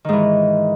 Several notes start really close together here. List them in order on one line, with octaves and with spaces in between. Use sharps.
D#3 G#2 E3